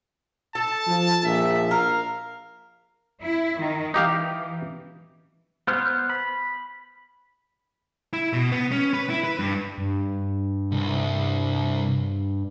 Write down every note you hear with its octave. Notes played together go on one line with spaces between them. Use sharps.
A4 A5
F3
A#1 E5
A#4 F5
E4
D#3
E3 D#4 G4 F5
B3 C5 F6
B5
E4
B2
B3
C#4
B4
E4
B4
G2
G2
C2